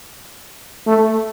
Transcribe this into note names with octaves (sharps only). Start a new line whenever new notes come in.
A3